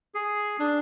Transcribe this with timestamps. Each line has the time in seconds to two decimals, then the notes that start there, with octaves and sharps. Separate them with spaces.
0.15 G#4
0.59 D4